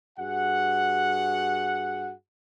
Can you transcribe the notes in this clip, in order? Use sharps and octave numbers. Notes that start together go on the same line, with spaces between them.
G2 F#4 G#4 F#5